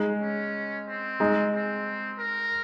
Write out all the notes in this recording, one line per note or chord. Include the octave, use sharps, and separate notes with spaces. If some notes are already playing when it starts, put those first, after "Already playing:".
Already playing: G#3 D#4 G#4
C#4
C4
G#3 D#4 G#4
C4
A#4